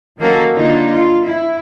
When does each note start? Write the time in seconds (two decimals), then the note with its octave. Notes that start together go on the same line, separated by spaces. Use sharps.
0.18 D#3 F#3 A#3 C#4 F#4 A4
0.54 D3 A#3 D4 D#4 F4
0.91 F4
1.25 E4